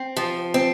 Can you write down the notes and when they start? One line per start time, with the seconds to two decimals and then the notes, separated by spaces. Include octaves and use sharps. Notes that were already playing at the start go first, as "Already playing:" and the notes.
Already playing: C4
0.17 F3
0.54 C4